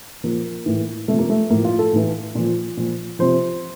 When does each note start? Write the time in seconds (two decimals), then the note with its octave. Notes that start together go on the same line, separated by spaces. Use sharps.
0.24 A#2 F3 A#3
0.66 A2 E3
1.08 C3 F3 A3
1.19 A#3
1.30 A3
1.50 A2 F3 A#3
1.65 F4
1.79 A4
1.93 A2 E3
2.35 A#2 F3
2.77 A#2 F3
3.19 C3 F3 C5